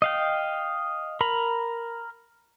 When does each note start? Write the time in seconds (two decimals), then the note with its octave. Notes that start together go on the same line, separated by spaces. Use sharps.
0.02 D#5 F5 G5
1.21 A#4 A#5 B5